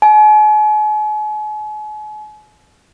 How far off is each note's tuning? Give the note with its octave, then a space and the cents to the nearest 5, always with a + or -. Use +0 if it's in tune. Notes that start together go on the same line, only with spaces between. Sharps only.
G#5 +40